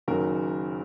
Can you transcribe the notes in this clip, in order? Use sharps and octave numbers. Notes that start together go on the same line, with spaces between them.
F#1 F#2 D#3 F#3 F#4 A#4